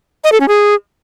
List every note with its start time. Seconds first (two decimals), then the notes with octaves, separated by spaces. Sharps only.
0.24 D#5
0.32 A4
0.40 C#4
0.48 G#4